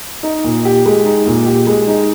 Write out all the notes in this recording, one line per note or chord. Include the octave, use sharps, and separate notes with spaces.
D#4
A#2
G4
G#3
D#4
A#2
G4
G#3
D#4